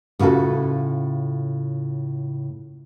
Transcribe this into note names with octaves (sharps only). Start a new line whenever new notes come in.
A2 C#3 F4 F#4 A4